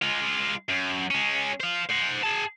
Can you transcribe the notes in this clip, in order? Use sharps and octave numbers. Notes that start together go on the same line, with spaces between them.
G#3 F4
F#2
G#3 C#4
C5 F5
C5 F#5
G#4 A5